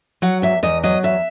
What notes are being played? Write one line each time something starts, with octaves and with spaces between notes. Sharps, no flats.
F#3 F#5
E2 E5
E2 D#5
F#3 D#5
E2 E5